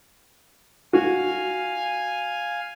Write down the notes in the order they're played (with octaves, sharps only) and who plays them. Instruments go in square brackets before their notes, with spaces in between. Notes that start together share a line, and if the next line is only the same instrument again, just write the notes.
[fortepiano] F#4 [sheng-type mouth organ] F5 G#5